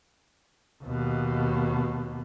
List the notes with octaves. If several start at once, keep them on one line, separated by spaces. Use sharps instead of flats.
D#2 B2